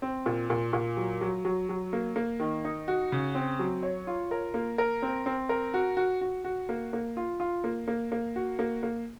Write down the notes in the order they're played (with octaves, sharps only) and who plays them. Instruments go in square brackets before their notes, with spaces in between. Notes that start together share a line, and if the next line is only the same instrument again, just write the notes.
[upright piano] C4
A#2
A#2
A#2
F#3
F#3
F#3
F#3
A#3
A#3
D#3
D#4
F#4
C#3
C4
F#3
C#5
F4
A#4
A#3
A#4
C4
C4
A#4
F#4
F#4
F#4
F#4
A#3
A#3
F4
F4
A#3
A#3
A#3
F#4
A#3
A#3